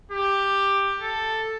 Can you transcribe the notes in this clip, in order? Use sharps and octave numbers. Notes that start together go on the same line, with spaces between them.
G4
A4